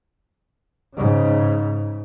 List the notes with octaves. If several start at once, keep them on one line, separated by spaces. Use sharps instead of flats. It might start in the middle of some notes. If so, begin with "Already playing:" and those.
G#2 C#3